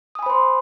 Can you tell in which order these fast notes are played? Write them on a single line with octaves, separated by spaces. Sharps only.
D#6 G#5 B5 C5 C6